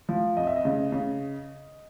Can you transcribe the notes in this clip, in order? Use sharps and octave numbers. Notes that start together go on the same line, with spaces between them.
F3
F2 D#5
E5
D#5
C#3
C#3